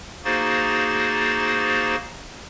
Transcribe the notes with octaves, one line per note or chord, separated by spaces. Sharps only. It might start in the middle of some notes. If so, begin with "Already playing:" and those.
A#3 D#4 F#4 G#4 C5 A6